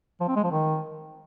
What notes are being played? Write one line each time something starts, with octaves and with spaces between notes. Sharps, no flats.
F3
C4
G#3
F3
D#3